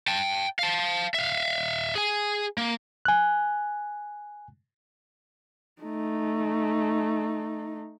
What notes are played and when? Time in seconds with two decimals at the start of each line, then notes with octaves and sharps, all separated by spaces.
0.08 G5 A5
0.59 F5 A5
1.14 E5 F5
1.95 G#4 G#5
2.58 A#3
3.05 G#5 F#6
5.81 A3 D#4